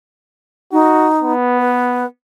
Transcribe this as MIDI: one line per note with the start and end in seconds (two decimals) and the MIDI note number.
0.72 1.33 63
0.72 1.09 66
1.23 2.04 59
1.59 2.06 71